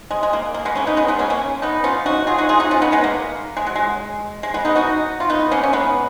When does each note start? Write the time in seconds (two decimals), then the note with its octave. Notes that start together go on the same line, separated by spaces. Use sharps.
0.11 G#3
0.23 G#3
0.33 A#3
0.54 A#3
0.65 G#3 B3
0.75 A#3 C#4
0.87 B3 D#4
0.97 G#3 B3
1.08 G#3 B3
1.19 A#3 C#4
1.30 A#3 C#4
1.62 B3 D#4
1.84 C#4 F4
2.06 D#4 F#4
2.27 F4 G#4
2.38 D#4 F#4
2.49 F4 G#4
2.60 D#4 F#4
2.71 C#4 F4
2.82 B3 D#4
2.92 G#3 B3
3.04 A#3
3.57 G#3
3.67 F#3
3.76 G#3
4.43 G#3
4.54 G#3 B3
4.65 B3 D#4
4.76 D#4 F#4
5.20 F4
5.30 B3 D#4
5.51 A#3 C#4
5.63 C#4
5.73 G#3 B3